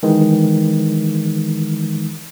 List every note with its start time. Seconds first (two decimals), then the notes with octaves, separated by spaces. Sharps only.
0.03 D#3 E3 G#3